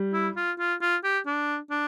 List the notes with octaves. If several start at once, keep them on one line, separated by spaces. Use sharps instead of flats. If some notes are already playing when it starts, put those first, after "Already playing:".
Already playing: G3
E4
F4
F4
F4
G4
D4
D4